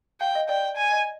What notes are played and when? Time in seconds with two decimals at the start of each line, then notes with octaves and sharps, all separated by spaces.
0.21 F5 G5
0.35 D#5
0.49 D5 G5
0.77 G#5
0.91 D#5